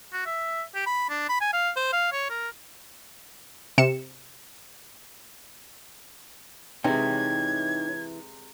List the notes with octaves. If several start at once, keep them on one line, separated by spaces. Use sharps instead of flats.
F#4
E5
G4
B5
D4
B5
G#5
F5
C5
F5
C#5
A#4
C3 C#7 E7
C3 E3 G#3 D#4 C#5 G5 G#6